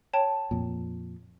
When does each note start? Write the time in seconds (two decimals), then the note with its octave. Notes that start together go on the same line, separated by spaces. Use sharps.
0.13 C#5 G5 A5
0.51 F2 A#2